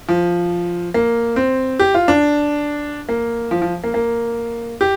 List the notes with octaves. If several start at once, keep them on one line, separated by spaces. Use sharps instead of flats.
F3
A#3
C4
G4
F4
D4
A#3
F3
F3
A#3
A#3
G4